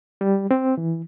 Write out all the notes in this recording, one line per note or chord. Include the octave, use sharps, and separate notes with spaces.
G3
C4
E3